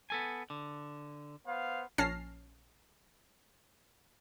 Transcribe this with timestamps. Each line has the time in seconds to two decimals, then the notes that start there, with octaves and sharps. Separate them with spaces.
0.10 B3 A4 G#5
0.50 D3
1.46 B3 C5 F5
1.98 A#1 C#4 A5 F6 A#6 C7